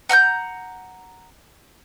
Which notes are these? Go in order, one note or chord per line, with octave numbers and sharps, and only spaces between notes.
F#5 A#5 F6 G6